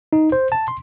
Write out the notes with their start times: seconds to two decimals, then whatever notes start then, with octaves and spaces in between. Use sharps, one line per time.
0.13 D#4
0.32 C5
0.52 A5
0.68 C6